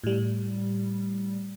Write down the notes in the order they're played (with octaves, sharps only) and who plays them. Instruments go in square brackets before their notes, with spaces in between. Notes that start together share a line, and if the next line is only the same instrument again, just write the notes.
[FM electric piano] A2 G3